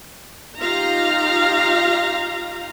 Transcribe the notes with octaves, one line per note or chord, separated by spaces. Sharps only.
D#4 F4 G4 F5 A#5